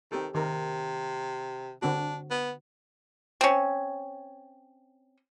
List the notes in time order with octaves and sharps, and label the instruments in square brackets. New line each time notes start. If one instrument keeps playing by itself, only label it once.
[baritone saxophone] D#3 [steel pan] C4 G4 A4
[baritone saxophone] C3 [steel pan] D#3 A#4
[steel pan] D3 C4 F#4 [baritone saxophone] D4
[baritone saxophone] B3
[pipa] C4 C#4